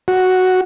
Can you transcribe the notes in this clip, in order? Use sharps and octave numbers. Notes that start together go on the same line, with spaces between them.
F#4